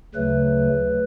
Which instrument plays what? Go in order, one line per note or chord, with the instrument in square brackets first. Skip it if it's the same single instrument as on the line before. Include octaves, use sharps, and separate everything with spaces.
[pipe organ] D2 C#3 F#3 A3 B4